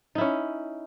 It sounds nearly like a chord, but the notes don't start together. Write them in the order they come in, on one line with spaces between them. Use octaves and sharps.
D#4 E4 C#4